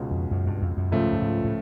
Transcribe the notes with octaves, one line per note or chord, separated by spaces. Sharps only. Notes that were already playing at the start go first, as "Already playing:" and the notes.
Already playing: C#2 B2 G#3 C#4
F2
F#2
G2
F2
F#2
C#2 G#2 C#3 F3 A3
G2
G#2
A2